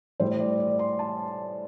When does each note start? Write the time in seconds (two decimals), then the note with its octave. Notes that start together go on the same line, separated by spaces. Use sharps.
0.20 A2 G3 C5
0.40 D5
0.60 D5
0.79 C6
0.99 A5